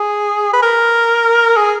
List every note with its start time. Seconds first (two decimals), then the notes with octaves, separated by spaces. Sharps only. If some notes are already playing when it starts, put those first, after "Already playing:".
Already playing: G#4
0.53 B4
0.62 A#4
1.56 G#4